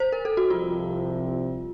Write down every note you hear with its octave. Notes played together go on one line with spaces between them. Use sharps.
C5
A#4
A4
F#4
C2 C3 F3 F4